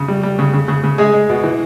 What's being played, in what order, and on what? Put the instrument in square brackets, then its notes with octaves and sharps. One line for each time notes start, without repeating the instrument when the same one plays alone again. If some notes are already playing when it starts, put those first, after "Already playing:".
Already playing: [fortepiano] C#3
G3
G3
C#3
C#3
C#3
C#3
G#3 G#4
G#3
B2
E3